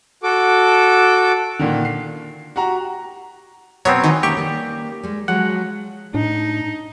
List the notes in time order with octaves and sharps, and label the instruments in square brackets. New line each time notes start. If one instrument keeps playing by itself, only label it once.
[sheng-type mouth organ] F#4 A4 D6
[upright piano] A#2 D3 D#3
C7
F#4 G4 F#5 A#5
[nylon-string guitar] B2 [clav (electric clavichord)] F#3 B3 C4 [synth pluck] C#5
[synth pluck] D#3 [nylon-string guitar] E3 G#5
[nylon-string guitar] A#3 C#4 D#4 [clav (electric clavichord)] G4 [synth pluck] C#6
[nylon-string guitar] G3 A#3
G3 G#3
[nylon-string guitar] F3 F#3 G#3 [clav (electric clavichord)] F#5
[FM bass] A2 [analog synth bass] D4 [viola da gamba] D#4